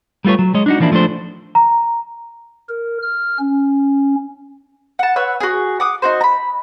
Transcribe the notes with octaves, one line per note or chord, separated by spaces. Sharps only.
G3 A3 F4 B4 C#5
F#3
G#3 C#5 D#5
D4 D#4 F#4
E3 F3 A#3 D4 E4
F3 A3 C4 D4 C5
A#5
A#4
F6
C#4
F#5 A5
B4 C#5 F#5 E6
F#4 G#4
F#5 D6 D#6
D#4 F#4 C5
A#5 B5